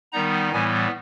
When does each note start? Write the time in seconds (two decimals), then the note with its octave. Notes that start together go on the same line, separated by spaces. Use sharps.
0.12 D#3 G3 B3 D#4 A#5
0.52 A2 E3 G3 B3 G#5